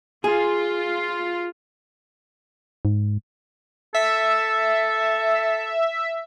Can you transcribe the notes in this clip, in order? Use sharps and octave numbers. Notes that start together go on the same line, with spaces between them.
F4 G#4
G#2
A4 E5